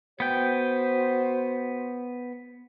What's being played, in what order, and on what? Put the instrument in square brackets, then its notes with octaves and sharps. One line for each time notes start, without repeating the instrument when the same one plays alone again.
[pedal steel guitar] B3 G5 [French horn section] F#4 C5